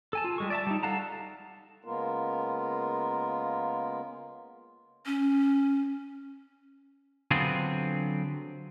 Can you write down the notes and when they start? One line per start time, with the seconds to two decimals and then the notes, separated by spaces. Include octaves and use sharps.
0.13 A4 G#5 A5
0.24 F4
0.38 G3 G#3 C#6
0.50 D5 E5 A5
0.67 G3 D#4
0.83 A4 F5 F#5 A5 A#5
1.84 C#3 G#3 A#3 B3 F4 A#4
5.06 C#4
7.31 D3 F#3 B3 C4 F4 G#4